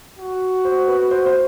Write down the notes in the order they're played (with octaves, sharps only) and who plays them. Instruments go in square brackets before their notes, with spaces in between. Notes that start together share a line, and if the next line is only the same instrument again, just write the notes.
[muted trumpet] F#4
[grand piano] C5
B4
C5
C5